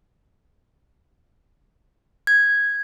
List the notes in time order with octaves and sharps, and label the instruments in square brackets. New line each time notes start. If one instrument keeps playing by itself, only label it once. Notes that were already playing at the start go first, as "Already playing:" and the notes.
[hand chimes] G#6